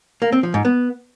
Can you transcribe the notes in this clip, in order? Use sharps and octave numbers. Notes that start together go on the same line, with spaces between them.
A#3
C4
F3
G#2
B3